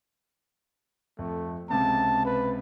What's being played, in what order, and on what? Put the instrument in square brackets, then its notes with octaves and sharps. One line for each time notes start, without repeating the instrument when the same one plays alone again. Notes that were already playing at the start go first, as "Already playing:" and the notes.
[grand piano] F2 [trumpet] A3
[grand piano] C#2 C3 [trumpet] A5
[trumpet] B4